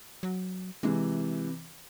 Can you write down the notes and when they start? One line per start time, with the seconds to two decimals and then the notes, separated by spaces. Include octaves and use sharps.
0.23 F#3
0.83 C3 E3 G#3